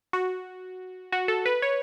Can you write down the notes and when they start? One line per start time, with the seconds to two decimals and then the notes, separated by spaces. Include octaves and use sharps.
0.13 F#4
1.12 F#4
1.28 A4
1.45 B4
1.62 C#5